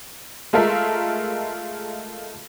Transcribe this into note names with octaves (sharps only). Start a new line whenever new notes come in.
G#3 A3 F4 A4 A#4 E5